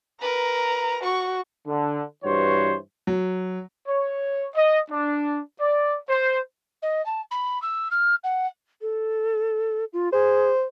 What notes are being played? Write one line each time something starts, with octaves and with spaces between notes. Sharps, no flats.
A#4 B4 A#5
F#4 C#6
D3
G2 E3 F#4 C5 C#5
F#3
C#5
D#5
D4
D5
C5
D#5
A5
B5
E6
F6
F#5
A4
F4
G#4 C5